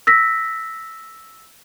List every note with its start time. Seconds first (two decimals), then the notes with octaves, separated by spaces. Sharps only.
0.07 E6 A#6 B6